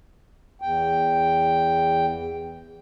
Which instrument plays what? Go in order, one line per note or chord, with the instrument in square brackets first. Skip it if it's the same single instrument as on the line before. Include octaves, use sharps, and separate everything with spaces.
[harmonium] E2 G5